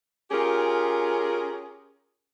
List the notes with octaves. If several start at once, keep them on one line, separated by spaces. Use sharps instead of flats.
C#4 F4 G4 G#4 A#4